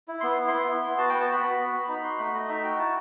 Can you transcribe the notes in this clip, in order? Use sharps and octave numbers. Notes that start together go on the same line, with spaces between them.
E4
B3 C6
E4
C6
B3
E4
B3
F#4 A5
B3 G5
A5
F#4 B5
B3 B5
F#4
B3
D#4 B5
F#4 C6
A3 B5
A3 D#5
D#4 E5
F#4 G5
E4 A5